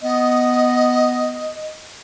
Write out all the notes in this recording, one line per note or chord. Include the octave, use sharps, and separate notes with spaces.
B3 D#5